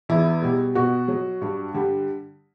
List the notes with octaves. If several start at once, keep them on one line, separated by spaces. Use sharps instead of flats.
E2 E4
B2 G3
B2 F#4
F#3
G2
D3 G3